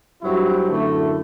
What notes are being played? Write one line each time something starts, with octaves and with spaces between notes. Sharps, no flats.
G2 F#3 C4 E4
F#2 D3 A3 E4